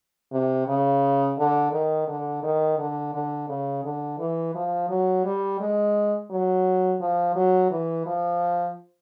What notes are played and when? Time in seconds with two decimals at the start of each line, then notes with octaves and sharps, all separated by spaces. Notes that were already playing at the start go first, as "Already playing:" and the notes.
0.32 C3
0.67 C#3
1.38 D3
1.72 D#3
2.08 D3
2.43 D#3
2.78 D3
3.14 D3
3.49 C#3
3.84 D3
4.18 E3
4.54 F3
4.89 F#3
5.25 G3
5.60 G#3
6.30 F#3
7.00 F3
7.35 F#3
7.71 E3
8.06 F3